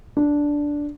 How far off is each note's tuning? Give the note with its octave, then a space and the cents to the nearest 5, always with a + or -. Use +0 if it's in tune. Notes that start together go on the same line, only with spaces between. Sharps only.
D4 -5